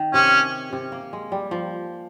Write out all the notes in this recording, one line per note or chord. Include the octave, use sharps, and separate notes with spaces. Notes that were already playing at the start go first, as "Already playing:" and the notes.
Already playing: D#3
C3 C#4
C3
A#3
G#3
G3
F3